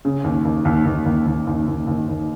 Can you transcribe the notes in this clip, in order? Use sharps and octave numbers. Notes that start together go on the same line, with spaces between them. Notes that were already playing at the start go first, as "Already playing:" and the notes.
C#3
D#2
D#2
D#2
D#2
D#2
D#2
D#2
D#2
D#2
D#2